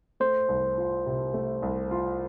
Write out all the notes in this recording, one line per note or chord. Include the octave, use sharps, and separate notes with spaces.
A3 C5
C2
F4
C3
A3
C2
F4